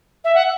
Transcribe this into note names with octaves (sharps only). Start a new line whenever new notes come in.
E5
F#5